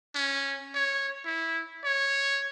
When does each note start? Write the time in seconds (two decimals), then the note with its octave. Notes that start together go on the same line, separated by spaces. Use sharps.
0.15 C#4
0.75 C#5
1.25 E4
1.85 C#5